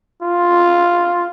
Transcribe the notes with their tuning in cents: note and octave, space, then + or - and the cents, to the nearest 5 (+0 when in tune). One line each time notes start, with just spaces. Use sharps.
F4 +0